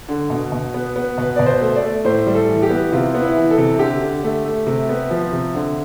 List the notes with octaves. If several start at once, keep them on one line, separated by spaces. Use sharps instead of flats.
D3
B2
B2
B3
B3
B2 B4
B2 D5
C5
A3
D5
A3
A2 C5
G3
A4
E3
G4
B3
C3 F4
B3
E4
E3
A4
C3
D3 G4
D3
A3
A3
C3
B3
F3
C3
D3